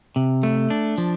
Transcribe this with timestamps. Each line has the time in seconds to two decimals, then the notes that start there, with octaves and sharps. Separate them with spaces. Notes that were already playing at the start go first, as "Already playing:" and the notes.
0.16 C3
0.43 A3
0.70 D4
0.98 F3